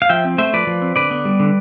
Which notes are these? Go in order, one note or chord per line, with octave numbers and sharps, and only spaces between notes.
F5
F3 E5 G5
C4
A3 C5 E5
F3 B4 D5
F3
C4
D3 B4 D5
B3
G3
D3